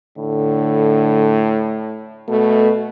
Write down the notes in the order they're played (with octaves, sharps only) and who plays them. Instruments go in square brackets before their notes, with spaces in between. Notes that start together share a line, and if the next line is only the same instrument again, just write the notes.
[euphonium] A2 [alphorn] D3
[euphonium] B2 [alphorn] A3